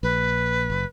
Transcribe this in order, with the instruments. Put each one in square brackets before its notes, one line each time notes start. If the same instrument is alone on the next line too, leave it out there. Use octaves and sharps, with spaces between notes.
[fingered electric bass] A#1 [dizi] B4
[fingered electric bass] F#1